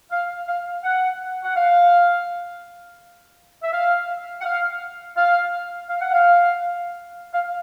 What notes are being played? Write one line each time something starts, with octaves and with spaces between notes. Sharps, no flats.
F5
F5
F#5
F#5
F5
E5
F5
F#5
F5
F5
F5
F#5
F5
F5